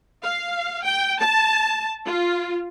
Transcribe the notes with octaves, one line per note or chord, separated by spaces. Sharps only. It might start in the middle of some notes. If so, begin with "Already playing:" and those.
F5
G5
A5
F4